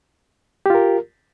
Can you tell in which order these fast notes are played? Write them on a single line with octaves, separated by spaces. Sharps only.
G4 F4 A#4